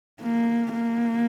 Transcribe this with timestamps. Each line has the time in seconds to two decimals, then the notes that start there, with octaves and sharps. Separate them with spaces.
0.21 A#3
0.73 A#3